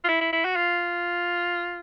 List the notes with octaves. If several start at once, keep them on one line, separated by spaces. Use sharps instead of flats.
F4
E4
E4
E4
F#4
F4